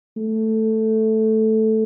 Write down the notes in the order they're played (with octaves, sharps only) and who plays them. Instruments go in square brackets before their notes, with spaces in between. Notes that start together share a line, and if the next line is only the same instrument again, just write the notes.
[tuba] A3